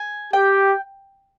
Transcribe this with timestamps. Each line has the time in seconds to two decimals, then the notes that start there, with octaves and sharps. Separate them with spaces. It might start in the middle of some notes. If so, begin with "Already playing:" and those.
Already playing: G#5
0.33 G4 G5